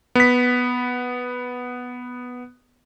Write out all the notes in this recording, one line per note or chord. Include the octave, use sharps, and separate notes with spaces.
B3 B6